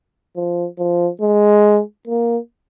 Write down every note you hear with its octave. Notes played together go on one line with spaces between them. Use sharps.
F3
F3
G#3
A#3